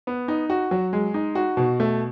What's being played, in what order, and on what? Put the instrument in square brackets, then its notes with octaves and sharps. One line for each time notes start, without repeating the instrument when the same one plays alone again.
[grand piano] B3
D#4
F#4
F#3
G#3
D#4
F#4
B2
A3